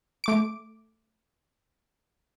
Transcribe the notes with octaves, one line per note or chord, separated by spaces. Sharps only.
A3 D6 D7